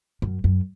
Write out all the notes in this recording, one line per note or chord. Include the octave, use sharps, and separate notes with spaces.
F#2
F#2